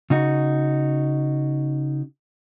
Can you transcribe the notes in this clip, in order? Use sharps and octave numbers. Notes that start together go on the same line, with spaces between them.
C#3 D#4 F#4